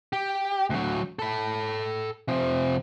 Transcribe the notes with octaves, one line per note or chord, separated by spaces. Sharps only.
G4
D2 F#3
A4 B5
C3 F3